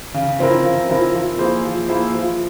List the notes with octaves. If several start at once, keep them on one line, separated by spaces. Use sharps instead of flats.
C#3
F3 C4 E4 A#4
C#3
F3 C4 E4 A#4
F3
A#3 E4 G#4 C5
F3
A#3 E4 G#4 C5
F3